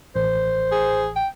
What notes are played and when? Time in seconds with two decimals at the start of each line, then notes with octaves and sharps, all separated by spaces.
0.16 A1 C5
0.72 G#4
1.15 G5